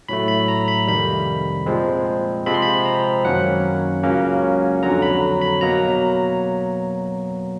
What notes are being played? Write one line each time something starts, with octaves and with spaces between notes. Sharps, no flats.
A2 F#3 A3 B5
B5
A#5
B5
F2 C3 D#3 G3 B5
A#2 F3 G#3 C4
C3 F3 G#3 C4 B5
C6
B5
A#5
F#2 D#3 F#3 A#3 C#4 F#5
C#2 C#3 F#3 A#3 C#4
F2 D3 F#3 A#5
B5
B5
B2 F#3 A#3 A#5